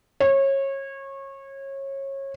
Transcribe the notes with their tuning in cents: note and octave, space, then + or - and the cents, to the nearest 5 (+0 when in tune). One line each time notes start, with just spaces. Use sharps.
C#5 -25